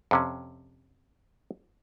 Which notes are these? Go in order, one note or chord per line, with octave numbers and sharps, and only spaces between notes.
F2 C3 C#4